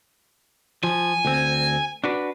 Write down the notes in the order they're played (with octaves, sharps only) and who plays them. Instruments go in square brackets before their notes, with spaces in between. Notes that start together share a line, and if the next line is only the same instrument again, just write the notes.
[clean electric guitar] F3 [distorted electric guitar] G#5
[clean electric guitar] D2 C4
D4 F#4 B4